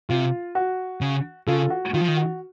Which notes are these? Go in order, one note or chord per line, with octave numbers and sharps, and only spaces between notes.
C3 F4
F#4
C#3
C#3 F4 A4
F#4
D#3 F4
F3
D#3
F#4